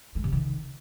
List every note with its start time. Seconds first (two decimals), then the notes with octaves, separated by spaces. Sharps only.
0.15 G#3
0.24 C3
0.32 D#3